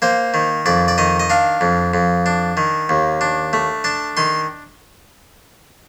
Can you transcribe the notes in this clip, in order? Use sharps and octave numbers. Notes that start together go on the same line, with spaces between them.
A#3 C5
D#3
F2 D5
D5
D#3 D#5
D#5
D4 F5
F2
F2
D4
D#3
D#2
D4
A3
D4 A5
D#3 C6